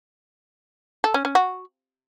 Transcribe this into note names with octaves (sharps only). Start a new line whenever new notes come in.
A4
C#4
C#4
F#4